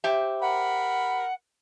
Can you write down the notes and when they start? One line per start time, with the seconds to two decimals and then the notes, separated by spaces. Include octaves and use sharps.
0.04 G4 C5 E5
0.42 A#4 F#5 B5